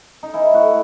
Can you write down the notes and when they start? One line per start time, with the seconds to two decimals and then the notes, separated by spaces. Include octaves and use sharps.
0.23 D#4
0.34 E3 E4
0.54 A2 F#4